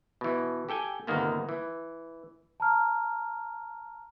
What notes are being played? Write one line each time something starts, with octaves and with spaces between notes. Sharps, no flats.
B2 E3
G4 A4 G5 G#5
G1 C3 D#3 A#3 B3
E3
A5 A#5 F6